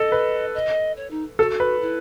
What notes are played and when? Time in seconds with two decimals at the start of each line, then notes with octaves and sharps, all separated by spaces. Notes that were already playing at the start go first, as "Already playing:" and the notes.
Already playing: A4 D#5
0.12 B4
0.55 D#5
0.97 C#5
1.11 D#4
1.38 F#4 A4
1.60 B4
1.81 E4